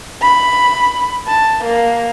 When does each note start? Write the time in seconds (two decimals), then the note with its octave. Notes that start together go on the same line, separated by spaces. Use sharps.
0.22 B5
1.27 A5
1.65 A#3